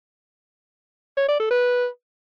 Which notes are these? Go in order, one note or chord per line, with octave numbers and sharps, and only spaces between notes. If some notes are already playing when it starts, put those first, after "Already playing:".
C#5
D5
A4
B4